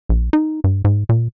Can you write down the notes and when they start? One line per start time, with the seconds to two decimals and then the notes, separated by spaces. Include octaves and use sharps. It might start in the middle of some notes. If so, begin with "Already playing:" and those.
0.09 A#1
0.33 D#4
0.64 G2
0.84 G#2
1.09 A#2